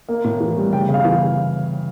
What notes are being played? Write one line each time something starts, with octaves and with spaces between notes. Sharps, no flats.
A#3
A2
E3
G3
C#3 G5
C#3
F5
E3